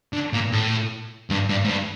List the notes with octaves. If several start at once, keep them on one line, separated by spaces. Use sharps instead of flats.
D3
A#2
A2
G2
G2
G#2
G2